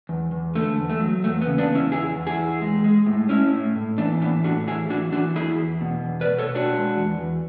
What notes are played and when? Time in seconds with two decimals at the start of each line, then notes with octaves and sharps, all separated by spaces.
0.09 E2
0.32 E2
0.55 D3 A3
0.78 E2
0.90 A3
1.00 F#3
1.24 E2 A3
1.41 B3
1.47 C#3
1.58 B3 D4
1.69 E2
1.75 C#4 E4
1.92 E2 E4 G#4
2.15 E2
2.27 E4 G#4
2.38 E2
2.61 G#3
2.84 G#3
3.06 A2
3.29 A2 C#4 E4
3.53 A2
3.76 A2
3.98 E3 B3 D4
4.21 A2 B3 D4
4.44 A2 D4 F#4
4.67 E3 E4 G#4
4.90 E3 D4 F#4
5.12 E3 D4 F#4
5.36 E2 E4 G#4
5.58 E2
5.81 B2
6.04 E2
6.21 B4 D5
6.27 B2
6.38 A4 C#5
6.50 B2
6.55 D4 F#4
6.73 G#3
6.95 E2
7.18 E2